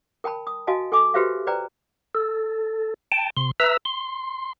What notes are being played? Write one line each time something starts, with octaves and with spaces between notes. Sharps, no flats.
A#4 G5 A5 B5
D#6
F#4 D#5 F5 G#5 A5
A4 G#5 D6
F#4 G4 B4 C5 E5 F5
B4 C5 D5 G5 A#5
A4
G5 A5
C3 C6
B4 E5 A#5 E6
C6